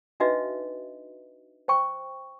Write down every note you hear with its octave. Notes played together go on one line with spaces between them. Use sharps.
D4 D#4 F#4 B4 D#5 E5
C5 G5 C#6